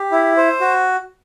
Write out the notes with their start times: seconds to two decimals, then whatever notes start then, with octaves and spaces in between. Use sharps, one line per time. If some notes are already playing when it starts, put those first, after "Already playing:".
Already playing: G4
0.12 E4
0.37 C5
0.61 F#4